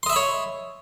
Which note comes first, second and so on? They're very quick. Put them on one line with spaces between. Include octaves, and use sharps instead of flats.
C6 D#5 E5 B5 C#5